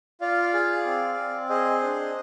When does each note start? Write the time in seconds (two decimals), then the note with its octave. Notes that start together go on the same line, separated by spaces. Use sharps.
0.21 F4 D5 F5
0.54 G#4
0.85 C4
1.18 C4
1.49 G#4 C5 D#5
1.82 D4